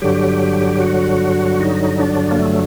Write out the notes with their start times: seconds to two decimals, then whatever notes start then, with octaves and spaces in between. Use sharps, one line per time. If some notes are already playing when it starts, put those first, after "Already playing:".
0.02 G2 D3 F#3 G4
0.80 F#4
1.60 D#4
1.99 D4
2.31 A#3
2.39 A3